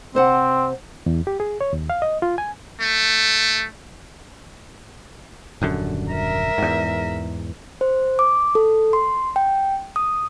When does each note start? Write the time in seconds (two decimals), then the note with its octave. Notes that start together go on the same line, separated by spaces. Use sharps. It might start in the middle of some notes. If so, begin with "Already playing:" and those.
0.15 C3 C4 C5 F#5
1.06 E2
1.27 G4
1.40 G#4
1.61 C#5
1.73 D#2
1.90 F5
2.02 D#5
2.22 F4
2.38 G#5
2.80 A3
5.62 D#1 F#2 D3
6.11 A#4 E5
6.58 E2 G#2
7.81 C5
8.19 D6
8.55 A4
8.93 C6
9.36 G5
9.96 D#6